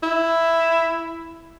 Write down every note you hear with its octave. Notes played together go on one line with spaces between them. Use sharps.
E4